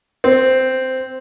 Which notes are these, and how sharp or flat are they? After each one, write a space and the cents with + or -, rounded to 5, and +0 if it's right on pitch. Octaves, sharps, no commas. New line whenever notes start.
C4 -10